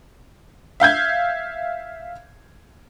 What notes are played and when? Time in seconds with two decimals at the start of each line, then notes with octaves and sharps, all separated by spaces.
0.80 E5 F5 G6 G#6